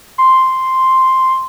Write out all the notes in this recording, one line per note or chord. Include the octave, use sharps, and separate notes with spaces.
C6